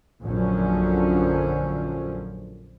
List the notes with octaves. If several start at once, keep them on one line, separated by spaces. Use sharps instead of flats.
A#1 F#2 D3 F3 C#4